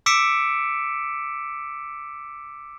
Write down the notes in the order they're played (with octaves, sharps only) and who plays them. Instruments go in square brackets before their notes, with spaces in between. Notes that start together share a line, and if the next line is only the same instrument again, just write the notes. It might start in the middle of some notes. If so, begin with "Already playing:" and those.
[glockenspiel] D6 E6 B6 C#7 D7 E7